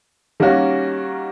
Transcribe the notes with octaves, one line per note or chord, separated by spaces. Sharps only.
D#3 G3 A#3 C#4 F#4